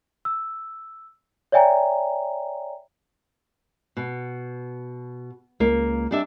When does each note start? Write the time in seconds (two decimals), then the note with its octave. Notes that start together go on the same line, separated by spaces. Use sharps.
0.25 E6
1.52 C#5 D5 E5 G5 G#5 A#5
3.97 B2
5.60 C#2 A#3
6.11 G3 D4 E5